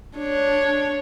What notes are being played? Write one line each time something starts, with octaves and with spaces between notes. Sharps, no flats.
D4 C#5